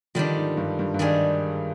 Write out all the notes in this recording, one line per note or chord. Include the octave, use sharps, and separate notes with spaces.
D3 D#3 F3 G3 D4
G#2
G2
G2
G2
G#2 D#3 G3 D4 G#4